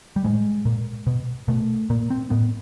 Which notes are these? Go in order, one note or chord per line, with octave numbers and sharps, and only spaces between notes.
G3
A2 G#3
A#2
B2
B2 A3
A#2 A#3
C4
A2 B3